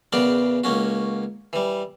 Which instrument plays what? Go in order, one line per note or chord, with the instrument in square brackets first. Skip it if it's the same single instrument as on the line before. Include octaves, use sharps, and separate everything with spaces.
[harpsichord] E2 C#3 B3 A#4 D5 G5
C#2 A#3 C#4 F#4
E3 G3